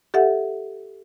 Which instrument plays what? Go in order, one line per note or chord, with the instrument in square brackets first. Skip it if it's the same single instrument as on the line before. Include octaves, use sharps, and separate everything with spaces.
[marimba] G4 A4 E5 F#5